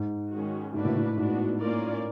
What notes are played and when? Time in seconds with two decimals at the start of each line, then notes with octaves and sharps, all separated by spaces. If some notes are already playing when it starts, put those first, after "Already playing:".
Already playing: G#2
0.32 D#3 G#3 C#4 F#4
0.74 G#2 A#3 D4 F#4 B4 D5
0.85 A2
0.96 A2
1.17 G#2 B3 D4 F#4
1.59 A#3 C#4 F4 A#4 D5